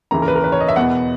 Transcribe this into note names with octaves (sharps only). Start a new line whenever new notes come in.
D#2 C#3 E3 A#5
A#4
B4
A#4
B4
C#5
D#5
E5
E2 B2 F#5